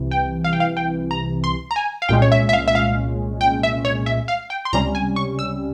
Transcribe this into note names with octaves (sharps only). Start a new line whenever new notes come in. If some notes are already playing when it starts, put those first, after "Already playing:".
Already playing: C2 C3 E3
G5
F5
G5
F5
G5
A#5
C6
A#5
G#5
F5
C2 A#2 G#3 C#4 G5
C#5
E5
E5
F5
E5
F5
G5
E5
C#5
E5
F5
G5
C6
C#2 C3 G3 C#4 A#5
G#5
C#6
E6